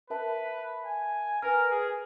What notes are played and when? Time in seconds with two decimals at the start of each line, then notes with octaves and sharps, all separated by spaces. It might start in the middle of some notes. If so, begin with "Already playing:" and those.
0.10 A#4 B4 E5 A5
0.85 G#5
1.42 A#4 B4 G#5 F6
1.71 G#4